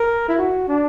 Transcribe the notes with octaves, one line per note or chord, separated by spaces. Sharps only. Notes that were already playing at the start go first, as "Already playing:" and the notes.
Already playing: A#4
E4
F#4
D4